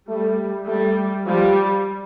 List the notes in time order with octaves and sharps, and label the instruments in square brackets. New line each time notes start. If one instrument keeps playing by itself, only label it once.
[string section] G3 [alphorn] A3
[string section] G3 [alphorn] A3
[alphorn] F3 [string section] G3